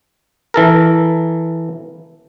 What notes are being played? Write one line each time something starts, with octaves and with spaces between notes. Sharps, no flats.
E3 A4 A#4